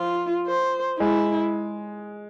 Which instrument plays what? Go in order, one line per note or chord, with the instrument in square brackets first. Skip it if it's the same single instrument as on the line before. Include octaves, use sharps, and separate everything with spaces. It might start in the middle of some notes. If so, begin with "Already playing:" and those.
Already playing: [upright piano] F3 [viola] F4
[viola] C5
[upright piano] G#3 [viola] E4